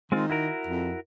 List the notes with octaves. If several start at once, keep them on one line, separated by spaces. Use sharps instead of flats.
D#3 G#3 C4 F4
E4 F#4 A#4
F2